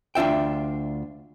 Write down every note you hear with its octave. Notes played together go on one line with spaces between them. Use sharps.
D2 D4 F4 E5 G5